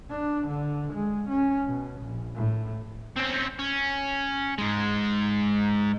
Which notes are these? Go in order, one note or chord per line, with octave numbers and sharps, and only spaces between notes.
D4
D3
G#3
C#4
B2
A#1
A2
C4 C#4
C#4
G#2 G#3